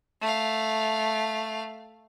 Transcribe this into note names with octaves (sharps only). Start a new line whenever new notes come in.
A3 F5